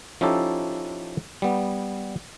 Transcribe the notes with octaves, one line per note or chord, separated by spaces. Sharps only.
F3 C#4 D#4 E4 G4 A4
G3 B3